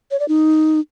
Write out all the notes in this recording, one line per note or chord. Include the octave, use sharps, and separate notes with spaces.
C#5
D5
D#4